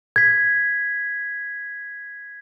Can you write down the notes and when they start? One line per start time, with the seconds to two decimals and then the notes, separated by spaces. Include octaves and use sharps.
0.16 G#6 B6